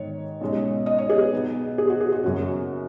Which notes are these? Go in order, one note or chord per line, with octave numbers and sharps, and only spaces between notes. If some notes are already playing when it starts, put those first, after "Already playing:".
Already playing: G#2 D#3 C#5
B1 B2 G#3 C#4
D#5
C#5
G#4
B4
B1 B2 B3
G#4
F#4
G#4
F#4
F#1 F#2 F#3 C#4